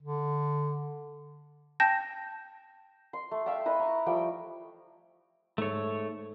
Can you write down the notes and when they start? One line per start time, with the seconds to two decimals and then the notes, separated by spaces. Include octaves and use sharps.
0.03 D3
1.80 G5 A5 G6 A#6
3.13 C6
3.31 A3
3.46 E5 F5 G5 A5
3.66 E4 B4 D#5 B5
3.79 A#5 C#6
4.06 F3 G3 A3 G5
5.58 G#2 A3 C#5